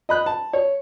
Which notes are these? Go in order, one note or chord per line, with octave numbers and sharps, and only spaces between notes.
D#5 B5 F#6
A5
C#5